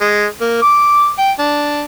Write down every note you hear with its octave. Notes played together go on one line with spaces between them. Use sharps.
G#3
A#3
D6
G5
D4